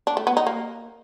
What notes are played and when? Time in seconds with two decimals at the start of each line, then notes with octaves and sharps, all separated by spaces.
0.07 D4
0.17 A3
0.27 B3
0.37 D#4
0.47 A#3